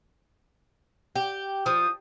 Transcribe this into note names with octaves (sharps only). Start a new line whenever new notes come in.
G4
F3 D#6